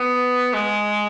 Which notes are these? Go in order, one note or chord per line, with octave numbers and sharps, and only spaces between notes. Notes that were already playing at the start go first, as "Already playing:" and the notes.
Already playing: B3
G#3